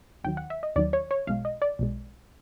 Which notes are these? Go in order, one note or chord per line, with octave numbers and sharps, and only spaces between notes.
D#2 D#3 F#3 G5
F#5
E5
D#5
D#2 D#3 F#3 D5
C#5
C#5
B1 B2 G#3 F5
D#5
D5
B1 B2 G#3